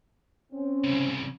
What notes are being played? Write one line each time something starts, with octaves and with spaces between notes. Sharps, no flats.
C4 C#4
C2 C#3